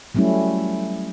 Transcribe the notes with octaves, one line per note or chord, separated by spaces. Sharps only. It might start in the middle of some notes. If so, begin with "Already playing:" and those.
F#3 G3 A3 C#4 E4